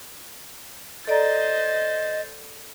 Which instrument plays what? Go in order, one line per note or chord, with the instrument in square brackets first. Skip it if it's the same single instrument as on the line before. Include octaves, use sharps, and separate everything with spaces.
[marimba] A4 D5 A#5 [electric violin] C5 A6 [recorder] D#5